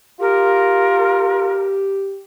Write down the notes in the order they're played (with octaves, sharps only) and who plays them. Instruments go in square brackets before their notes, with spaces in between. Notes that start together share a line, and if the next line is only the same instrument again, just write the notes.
[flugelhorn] F4 [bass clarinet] G4 [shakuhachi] A#4